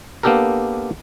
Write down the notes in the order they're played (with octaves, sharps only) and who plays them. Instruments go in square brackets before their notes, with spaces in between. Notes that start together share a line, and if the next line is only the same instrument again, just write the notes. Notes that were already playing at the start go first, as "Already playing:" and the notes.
[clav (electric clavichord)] A#3 B3 D4 G4 A4 A#4